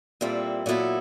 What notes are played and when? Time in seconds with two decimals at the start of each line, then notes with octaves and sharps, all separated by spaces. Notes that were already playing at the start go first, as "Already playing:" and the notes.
0.21 A#2 G3 C4 E4 A4
0.66 A#2 F#3 B3 E4 A4